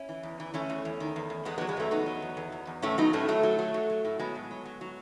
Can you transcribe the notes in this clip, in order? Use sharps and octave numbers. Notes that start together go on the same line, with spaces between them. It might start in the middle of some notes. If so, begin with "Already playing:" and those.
Already playing: C#4 E4
E3
E2
E3
E3 A3 C#4
E2
E2
D#3
E2
E2
E2 G#3 B3
G#3 B3
F#3
G#3 B3
E2 A3 C#4
E2 B3 D#4
F#3
E2
E2
E2
E2
A2 A3 C#4
F#3 B3 D#4
A2 A3 C#4
F#3 A3
F#3
F#3
F#3
F#3
A2
F#3 G#3 B3
A2
F#3
F#3
F#3